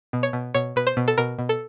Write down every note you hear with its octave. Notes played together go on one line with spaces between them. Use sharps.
B2
C#5
B2
B2 C#5
B2 B4
C5
B2
A4
B2 A#4
B2
A4